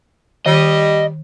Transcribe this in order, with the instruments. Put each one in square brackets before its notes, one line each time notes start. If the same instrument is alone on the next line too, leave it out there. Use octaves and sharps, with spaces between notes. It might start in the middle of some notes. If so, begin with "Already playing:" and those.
[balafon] D#3 [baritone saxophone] G3 [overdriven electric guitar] D#5